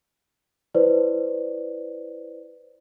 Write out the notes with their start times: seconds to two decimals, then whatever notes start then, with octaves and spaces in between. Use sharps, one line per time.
0.75 E4 B4 C5 D5